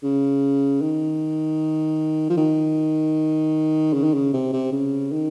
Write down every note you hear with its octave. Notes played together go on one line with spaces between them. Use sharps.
C#3
D#3
F3
D#3
C#3
D#3
C#3
C3
C3
C#3
D#3